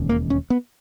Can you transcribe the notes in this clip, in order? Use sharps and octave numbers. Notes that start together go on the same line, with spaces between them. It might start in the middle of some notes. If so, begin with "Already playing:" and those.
Already playing: E1 D#2 C#3
A#3
C#4
B3